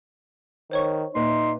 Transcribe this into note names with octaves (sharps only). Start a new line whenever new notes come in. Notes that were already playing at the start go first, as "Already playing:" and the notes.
D#3 C5 C#5 C#6
A#2 D#4 B4 E5 C6